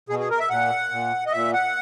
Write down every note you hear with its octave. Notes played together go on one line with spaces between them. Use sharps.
B2 G#4
G#4
A#4
E5
A#2 F#5
A#2
D#5
A#2 E5
F#5